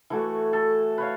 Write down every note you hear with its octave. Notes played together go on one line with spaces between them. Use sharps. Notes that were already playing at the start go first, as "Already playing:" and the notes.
E3 A3 F#4
A4
B4 C#5 F5